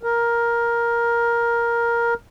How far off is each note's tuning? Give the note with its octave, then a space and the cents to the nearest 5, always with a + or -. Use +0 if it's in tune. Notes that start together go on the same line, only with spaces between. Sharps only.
A#4 +10